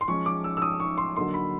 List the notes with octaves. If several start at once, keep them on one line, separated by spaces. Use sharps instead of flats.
C6
F3 G#3 C#4 C#6
D6
E6
E6
D#6
C#6
C6
D3 F#3 A#3 D#4 C6
B5